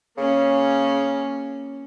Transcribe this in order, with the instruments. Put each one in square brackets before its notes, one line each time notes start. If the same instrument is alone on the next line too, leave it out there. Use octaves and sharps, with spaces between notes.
[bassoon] C#3 [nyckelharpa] A#3 C#4